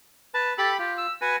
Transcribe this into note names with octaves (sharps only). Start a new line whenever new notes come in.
B4 A5
G4 A4 B5
F4 G4
E6
F#4 B4 G#5